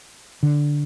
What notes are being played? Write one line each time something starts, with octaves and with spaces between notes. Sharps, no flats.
D3